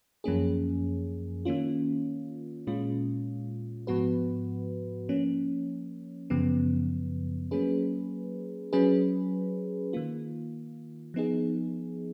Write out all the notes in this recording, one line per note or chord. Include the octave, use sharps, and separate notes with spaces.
F#2 F3 A#3 C#4 G#4
D#3 A#3 C#4 F4
A#2 G#3 C#4 F4
G#2 F3 B3 F#4 B4
F3 A#3 C#4
F#2 C#3 F3 B3
F#3 A#3 C#4 G#4 B4
F#3 C#4 G#4 B4
D#3 A#3 F4
F3 B3 D#4 G#4